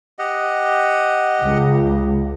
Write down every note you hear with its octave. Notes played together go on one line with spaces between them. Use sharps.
G4 D#5 F#5
C#2